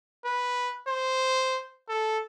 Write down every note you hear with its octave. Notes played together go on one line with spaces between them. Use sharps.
B4
C5
A4